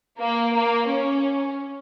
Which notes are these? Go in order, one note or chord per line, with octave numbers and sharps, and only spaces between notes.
A#3
A#3
C#4